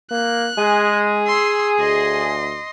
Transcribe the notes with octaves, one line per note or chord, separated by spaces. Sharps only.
A#3 F#6
G#3 G#4
C6 E6
D2 D#5 C6